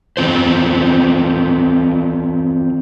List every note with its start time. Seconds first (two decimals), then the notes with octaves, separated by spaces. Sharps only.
0.17 E3 C4 F4 C5